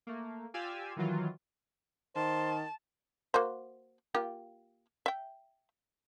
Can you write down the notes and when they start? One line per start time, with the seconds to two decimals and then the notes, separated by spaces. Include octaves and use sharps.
0.07 A3 A#3
0.54 F4 G4 D5 F5 G#5 E6
0.96 D#3 E3 F#3 F4
2.16 D#3 C5 A5
3.34 A#3 F#4 C5
4.14 A#3 F4 G4
5.06 E5 G5